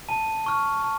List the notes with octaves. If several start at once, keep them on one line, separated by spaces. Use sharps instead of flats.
A5
C#6 F6
A5